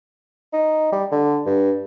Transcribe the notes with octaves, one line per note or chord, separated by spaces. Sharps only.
D#4
G3
D3
G2